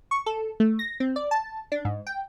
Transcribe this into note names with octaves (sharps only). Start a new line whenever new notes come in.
C#6
A4
A3
A#6
C4
D5
A5
D4
G#2
G5